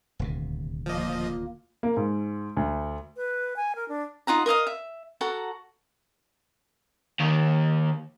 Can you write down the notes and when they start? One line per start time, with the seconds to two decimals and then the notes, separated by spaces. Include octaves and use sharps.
0.19 D#1 D2 C3
0.86 A#2 F3 A#3 D#5
1.83 A#3
1.97 G#2
2.57 D2
3.16 B4
3.56 G#5
3.75 A#4
3.89 D4
4.27 D#4 F4 F#5 A#5
4.46 A#4 D#5 F5 D#6
4.67 E5
5.21 F#4 A4 F#5 A#5
7.20 D#2 D#3